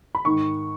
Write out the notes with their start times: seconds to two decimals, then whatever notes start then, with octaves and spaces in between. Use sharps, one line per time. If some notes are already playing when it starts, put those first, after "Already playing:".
0.15 B5
0.25 G#2 D#3 C#6